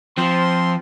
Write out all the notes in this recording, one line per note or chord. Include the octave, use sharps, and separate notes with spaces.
F3 C4 C6